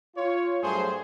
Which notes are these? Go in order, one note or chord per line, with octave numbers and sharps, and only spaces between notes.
F4 C#5
G2 F#3 A3 G#4 C5 C6